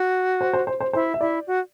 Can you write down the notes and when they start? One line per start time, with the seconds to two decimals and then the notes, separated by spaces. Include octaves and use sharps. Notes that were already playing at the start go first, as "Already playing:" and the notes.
Already playing: F#4
0.41 C5
0.53 C5
0.67 C5
0.80 C5
0.93 E4 C5
1.14 E5
1.21 E4 D5
1.47 F#4